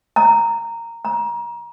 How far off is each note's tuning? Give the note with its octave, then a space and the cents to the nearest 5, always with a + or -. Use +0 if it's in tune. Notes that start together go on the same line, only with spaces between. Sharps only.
A#5 -10
A#5 +25